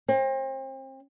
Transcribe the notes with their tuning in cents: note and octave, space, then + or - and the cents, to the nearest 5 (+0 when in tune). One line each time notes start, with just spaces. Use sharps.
C4 +35